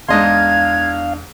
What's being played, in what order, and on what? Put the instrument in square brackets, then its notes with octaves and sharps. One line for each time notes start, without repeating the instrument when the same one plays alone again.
[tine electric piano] E2 D4 [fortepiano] G#2 D#5 C6 [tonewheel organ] F5 [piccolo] G#6